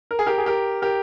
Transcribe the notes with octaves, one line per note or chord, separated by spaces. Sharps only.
A#4
G#4
G4 A#4
G#4
G4 A#4
G4 A#4